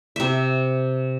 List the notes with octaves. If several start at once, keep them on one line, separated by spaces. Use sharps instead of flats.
C3 E5